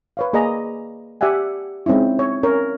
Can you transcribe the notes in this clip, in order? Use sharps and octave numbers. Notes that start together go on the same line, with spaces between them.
B4 C#5 F5
A#3 G#4 D5 D#5 A#5
G4 D5 E5 F#5 G#5
G#3 C4 C#4 D#4 E4
C#5
C#4 A#4 C#5